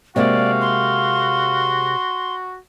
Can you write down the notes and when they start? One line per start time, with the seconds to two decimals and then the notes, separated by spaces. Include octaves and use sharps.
0.16 C3 G#3 A#3 F#4 D5 F5
0.61 C6